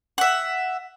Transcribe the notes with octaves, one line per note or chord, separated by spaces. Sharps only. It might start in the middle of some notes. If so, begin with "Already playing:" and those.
E5 F#5